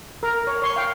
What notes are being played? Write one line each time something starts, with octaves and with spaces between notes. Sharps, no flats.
A#4
C#5
C#5 C6 C#6
F5 G5